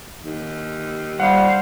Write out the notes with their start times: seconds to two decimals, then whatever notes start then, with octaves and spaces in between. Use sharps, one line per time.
0.23 D#2
1.20 G3 C5 F5 F#5